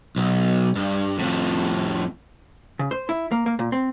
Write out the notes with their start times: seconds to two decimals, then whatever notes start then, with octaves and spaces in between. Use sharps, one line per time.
0.16 B1
0.76 G2
1.19 F2 A2
2.79 C#3
2.91 C5
3.09 E4
3.31 A#3
3.46 A#3
3.59 A#2
3.72 C4